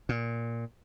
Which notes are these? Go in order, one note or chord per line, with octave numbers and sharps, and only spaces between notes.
A#2